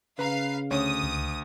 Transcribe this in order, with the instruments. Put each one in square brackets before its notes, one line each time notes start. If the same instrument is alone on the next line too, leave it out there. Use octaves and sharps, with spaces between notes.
[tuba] C#3 [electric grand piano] B4 A#5 [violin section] F5 C7
[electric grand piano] D2 [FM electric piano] C#4 C#5 [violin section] D#6
[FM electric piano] C#2